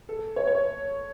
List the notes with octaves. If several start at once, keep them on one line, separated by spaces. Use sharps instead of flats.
A4
C#5
C#5